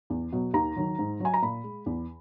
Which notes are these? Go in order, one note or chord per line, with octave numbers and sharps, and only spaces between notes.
E2
B2 F#3
D#2 A#5
D#3 F#3
G#2
F#3 G#5
A#5
A#2 B5
G#3
E2